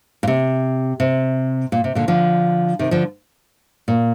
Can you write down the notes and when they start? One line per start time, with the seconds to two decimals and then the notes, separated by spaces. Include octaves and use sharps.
0.23 A#2
0.27 C3
1.00 C3
1.72 A#2
1.84 C3
1.95 A#2 D3
2.08 D3 F3
2.79 C3 D#3
2.91 D3 F3
3.88 A#2